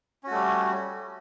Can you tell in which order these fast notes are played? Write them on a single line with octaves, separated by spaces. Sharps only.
C#4 F#4 A3 G3